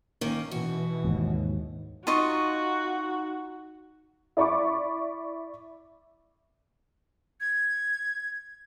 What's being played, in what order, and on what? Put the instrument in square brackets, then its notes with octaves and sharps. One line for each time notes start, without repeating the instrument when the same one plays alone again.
[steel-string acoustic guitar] D#3 A#3 [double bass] C#4
[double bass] B2 E3 [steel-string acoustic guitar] F#4
[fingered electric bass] D#2 G#2
[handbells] D#4 [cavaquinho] F4 D#5 C#6 [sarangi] F#4
[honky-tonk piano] E4 D5 B5 C#6 D6
[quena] G#6